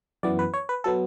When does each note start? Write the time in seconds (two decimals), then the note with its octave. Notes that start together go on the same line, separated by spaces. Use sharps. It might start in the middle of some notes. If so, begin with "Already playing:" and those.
0.23 F#2 E3 B3 D5
0.39 B4
0.54 C#5
0.69 B4
0.84 F#3 B3 A4